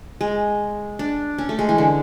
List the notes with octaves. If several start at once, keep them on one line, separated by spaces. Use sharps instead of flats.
G#3
D4
C#4
A3
G#3
E3
D3